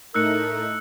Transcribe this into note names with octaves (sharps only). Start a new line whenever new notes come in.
A2 A3 D#4 A#4 E6 F#6 C#7